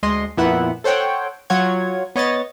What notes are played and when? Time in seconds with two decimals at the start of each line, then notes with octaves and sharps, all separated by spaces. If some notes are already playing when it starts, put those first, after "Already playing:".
0.03 D2 G#3 D#5 C6
0.37 F2 A#2 B3 E4 E5 F#5
0.84 A4 C5 C#5 F#5 G5
1.50 F#3 F4 C#5 F#5 G#6
2.15 B3 C#5 D#5 A6